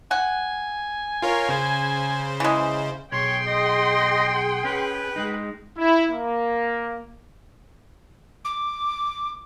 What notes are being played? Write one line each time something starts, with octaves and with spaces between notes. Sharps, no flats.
F#5 G#5
F4 A#4 C#5
C#3 C5
E3 G#3
B1 G#4 C#5 G5 C6
D#5
C#4 B4
G#3 D#4
E4
A#3
D6